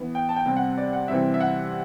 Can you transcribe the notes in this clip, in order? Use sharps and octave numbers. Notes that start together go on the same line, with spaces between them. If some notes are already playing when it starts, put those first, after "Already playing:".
Already playing: E3 B3
G5
A5
G5
C3 G3 C4
F#5
D5
F#5
C3 E3 G3 C4 E5
E5
F#5